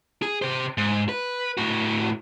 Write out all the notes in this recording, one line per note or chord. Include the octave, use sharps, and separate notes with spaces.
G#4
C3 C5
G#2
B4
A2 F#4